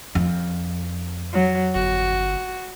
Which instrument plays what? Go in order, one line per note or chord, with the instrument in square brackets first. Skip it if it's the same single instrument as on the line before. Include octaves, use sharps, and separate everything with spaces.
[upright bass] F2
[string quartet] F#3
[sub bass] G1 [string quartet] F#4